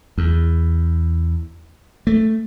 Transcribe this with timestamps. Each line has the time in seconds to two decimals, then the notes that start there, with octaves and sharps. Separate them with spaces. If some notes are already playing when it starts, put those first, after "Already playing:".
0.18 E2
2.07 A3